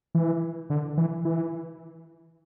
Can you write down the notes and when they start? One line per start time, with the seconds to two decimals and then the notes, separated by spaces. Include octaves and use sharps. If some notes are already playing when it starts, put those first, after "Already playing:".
0.15 E3
0.70 D3
0.97 E3
1.25 E3